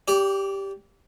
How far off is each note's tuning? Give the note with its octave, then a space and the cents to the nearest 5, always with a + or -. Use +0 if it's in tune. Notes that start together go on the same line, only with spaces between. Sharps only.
G4 +0 D5 -30